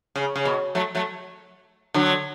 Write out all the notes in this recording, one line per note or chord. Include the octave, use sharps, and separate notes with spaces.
C#3
C#3
B2
F#3 A3
F#3 A3
D3 F#3